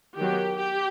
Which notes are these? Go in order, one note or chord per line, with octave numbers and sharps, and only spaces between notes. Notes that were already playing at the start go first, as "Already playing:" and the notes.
D#3 F#3 B3 G4
G4